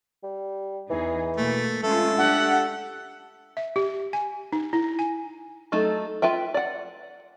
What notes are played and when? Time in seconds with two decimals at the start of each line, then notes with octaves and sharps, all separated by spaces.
0.24 G3
0.90 E2 E3 D#4 G#4
1.37 B2 A3 A#3
1.83 G#3 A3 C#4 F4 A4
2.18 D4 G4 F#5
3.57 E5
3.76 G4
4.13 G#5
4.52 D#4
4.73 E4
4.99 G#5
5.72 F#3 A3 D#4 A4
6.22 F4 B4 E5 G5
6.54 D5 F#5